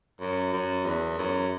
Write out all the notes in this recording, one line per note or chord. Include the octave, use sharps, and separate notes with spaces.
F#2
F#2
E2
F#2